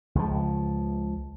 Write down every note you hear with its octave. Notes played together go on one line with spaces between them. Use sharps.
C#2 F3